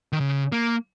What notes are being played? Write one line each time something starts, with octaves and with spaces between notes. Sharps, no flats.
D#3
C#3
A#3